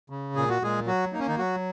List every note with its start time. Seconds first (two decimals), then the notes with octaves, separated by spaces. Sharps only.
0.10 C#3
0.35 A#2 G#4
0.49 F#4
0.62 A#2 G#3 G#4
0.87 F#3 F#4
1.12 A#3 D#4
1.19 C#4
1.28 D#3 D#4
1.38 F#3 F#4